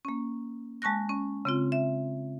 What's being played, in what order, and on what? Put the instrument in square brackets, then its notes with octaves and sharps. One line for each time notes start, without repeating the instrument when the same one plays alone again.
[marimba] A#3 C#4
G#3 A5 C#6 F#6 A#6
C#4
C#3 C4 F4
E5